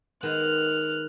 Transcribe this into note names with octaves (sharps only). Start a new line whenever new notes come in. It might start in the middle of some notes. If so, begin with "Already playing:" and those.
D#3 G#3 B3 F6 F#6